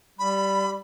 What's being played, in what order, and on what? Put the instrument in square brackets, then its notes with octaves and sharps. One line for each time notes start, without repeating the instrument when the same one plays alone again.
[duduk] G3 [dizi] B5